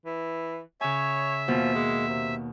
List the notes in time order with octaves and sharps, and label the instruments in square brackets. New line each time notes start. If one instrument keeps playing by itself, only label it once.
[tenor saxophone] E3
[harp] C#3 G#5 [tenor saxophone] C#5 [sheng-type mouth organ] E5
[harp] D#2 B2 A#3 [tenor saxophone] F3
[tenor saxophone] G#3
C3